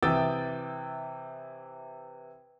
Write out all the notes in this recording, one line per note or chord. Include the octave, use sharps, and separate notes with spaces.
C3 E3 G5 D#6 E6 A6